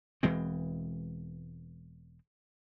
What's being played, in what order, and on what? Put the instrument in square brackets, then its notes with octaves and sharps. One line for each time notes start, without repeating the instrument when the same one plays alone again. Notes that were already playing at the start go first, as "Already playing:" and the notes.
[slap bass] E1 E3 G#3 C4